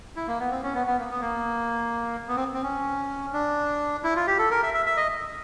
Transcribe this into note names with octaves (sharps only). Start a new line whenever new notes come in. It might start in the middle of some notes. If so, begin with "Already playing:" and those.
E4
A#3
B3
C4
C#4
B3
B3
A#3
B3
A#3
B3
C4
C4
C#4
D4
E4
F4
G4
A4
A#4
E5
E5
E5
D#5